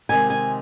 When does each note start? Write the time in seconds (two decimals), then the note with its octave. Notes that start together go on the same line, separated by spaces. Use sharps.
0.09 C3 D#3 G#3 G#5
0.30 G#5